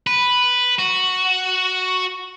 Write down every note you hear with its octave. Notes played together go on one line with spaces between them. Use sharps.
B4
F#4